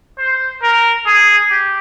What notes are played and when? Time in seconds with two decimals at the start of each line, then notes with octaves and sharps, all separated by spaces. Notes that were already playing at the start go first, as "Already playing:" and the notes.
0.18 C5
0.62 A#4
1.06 G#4
1.51 G4